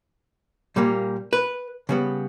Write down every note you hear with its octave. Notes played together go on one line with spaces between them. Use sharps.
A#2 G3 A#3
B4
C#3 G3 B3